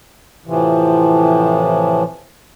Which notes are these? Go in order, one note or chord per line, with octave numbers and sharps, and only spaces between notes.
A2 C3 E3 F3